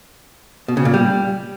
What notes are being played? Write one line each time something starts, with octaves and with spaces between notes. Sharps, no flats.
B2
C#3
A#2
G3